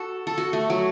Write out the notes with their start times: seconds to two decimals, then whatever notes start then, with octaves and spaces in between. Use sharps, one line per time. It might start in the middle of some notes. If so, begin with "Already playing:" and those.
Already playing: F#4 A4
0.27 A4
0.38 F#4
0.53 A3
0.70 F#3